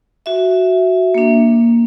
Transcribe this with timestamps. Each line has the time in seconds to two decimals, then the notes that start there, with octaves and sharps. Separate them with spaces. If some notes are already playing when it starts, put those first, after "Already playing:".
0.26 F#4 E5
1.14 A#3 D4